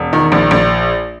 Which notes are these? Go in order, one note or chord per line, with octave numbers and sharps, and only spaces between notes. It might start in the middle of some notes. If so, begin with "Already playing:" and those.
Already playing: E1
D#3
A#1
A#1